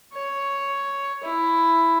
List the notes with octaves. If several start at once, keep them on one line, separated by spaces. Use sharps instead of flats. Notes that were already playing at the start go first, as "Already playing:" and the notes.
C#5
E4